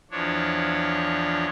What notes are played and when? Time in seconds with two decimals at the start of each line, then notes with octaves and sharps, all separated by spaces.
0.11 E2 F3 D4 C#5